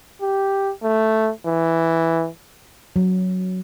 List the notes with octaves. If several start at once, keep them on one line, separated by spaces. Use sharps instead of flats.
G4
A3
E3
F#3